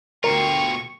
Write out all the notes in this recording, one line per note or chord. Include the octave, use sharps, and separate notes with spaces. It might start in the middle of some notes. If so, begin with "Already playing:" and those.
D2 B2 F4 A#4 G5 C#6